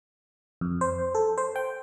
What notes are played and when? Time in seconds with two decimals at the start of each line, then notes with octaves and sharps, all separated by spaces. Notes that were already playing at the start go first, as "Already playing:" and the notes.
0.61 F2
0.81 C5
1.15 A4
1.38 C5
1.56 G5